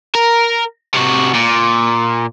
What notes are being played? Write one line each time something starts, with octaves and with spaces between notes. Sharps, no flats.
A#4
C3 F#4
A#2